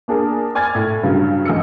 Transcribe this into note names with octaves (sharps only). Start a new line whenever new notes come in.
A#3 D4 G#4 A#4
D5 G#5 F6 G#6 A6
A2
G2 C#3 F#3
A1 D#5 E6 C#7